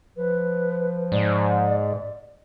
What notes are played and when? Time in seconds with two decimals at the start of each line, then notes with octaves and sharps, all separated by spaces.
0.17 F3 B4
1.12 G#2 D5